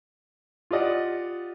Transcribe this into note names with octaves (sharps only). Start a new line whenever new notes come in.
F4 G4 D5 D#5 F#5